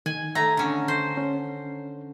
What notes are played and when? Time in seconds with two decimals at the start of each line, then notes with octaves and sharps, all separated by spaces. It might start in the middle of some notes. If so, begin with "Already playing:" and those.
0.06 D#3 G#5 G#6
0.35 A3 A#5
0.57 D3 C#4
0.88 C5
1.17 C#4